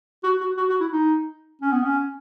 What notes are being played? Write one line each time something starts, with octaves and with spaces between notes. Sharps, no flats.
F#4
F#4
F#4
F#4
E4
D#4
C#4
B3
C#4